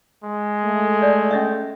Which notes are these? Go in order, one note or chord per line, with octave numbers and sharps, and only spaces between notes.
G#3
A3
D5
C#4 D#5 E5